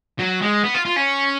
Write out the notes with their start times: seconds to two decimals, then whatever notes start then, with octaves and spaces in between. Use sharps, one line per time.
0.19 F#3
0.42 G#3
0.63 B3
0.74 F4
0.85 F4
0.96 C#4